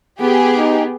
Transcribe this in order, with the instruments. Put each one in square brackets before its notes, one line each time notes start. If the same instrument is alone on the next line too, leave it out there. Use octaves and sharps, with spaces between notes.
[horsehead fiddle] B3 [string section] G4 G#4
[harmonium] D#4